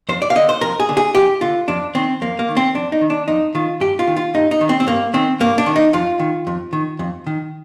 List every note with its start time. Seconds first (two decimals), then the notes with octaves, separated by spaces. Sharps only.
0.09 F2 C5
0.22 D5
0.30 F5
0.35 D3 D#5
0.49 C5
0.61 F2 A#4
0.80 G#4
0.89 D3
0.97 G#4
1.15 F2 G4
1.41 D3 F4
1.68 F2 D4
1.95 D#3 C4
2.21 F2 A#3
2.39 A#3
2.48 D#3
2.57 C4
2.74 F2 D4
2.92 D#4
3.01 D#3
3.10 D4
3.28 F2 D#4
3.55 D#3 F4
3.80 G2 G4
3.99 F4
4.07 D#3
4.16 F4
4.34 G2 D#4
4.51 D#4
4.61 D#3
4.69 C4
4.80 C4
4.87 G2 A#3
5.14 D#3 C4
5.40 G2 A#3
5.58 D4
5.66 D#3
5.76 D#4
5.93 F2 F4
6.19 D#3
6.47 F2
6.73 D#3
6.99 F2
7.27 D#3